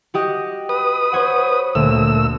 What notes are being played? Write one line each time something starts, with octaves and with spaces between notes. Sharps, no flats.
F#4 G4 D#5
B4 D#6
C5 C#5 F#5
D2 A#2 A3 E6